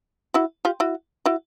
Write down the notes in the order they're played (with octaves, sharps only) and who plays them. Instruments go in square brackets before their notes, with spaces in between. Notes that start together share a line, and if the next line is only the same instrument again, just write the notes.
[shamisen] E4 F#4
F4 G4
E4 F#4
E4 F#4